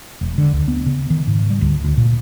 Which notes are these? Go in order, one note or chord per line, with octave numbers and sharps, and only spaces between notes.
E1
D3
D2
B3
C#3
D#3
G#2
G3
D2
D2
A#2